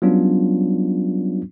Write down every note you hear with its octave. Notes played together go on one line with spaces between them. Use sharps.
F#3 G3 B3 C#4 D4 F4